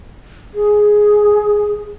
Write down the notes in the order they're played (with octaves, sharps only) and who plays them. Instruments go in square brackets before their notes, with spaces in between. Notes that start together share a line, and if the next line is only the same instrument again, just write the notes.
[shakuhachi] G#4